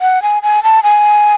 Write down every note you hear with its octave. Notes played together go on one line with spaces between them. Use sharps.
F#5
G#5
G#5
A5
G#5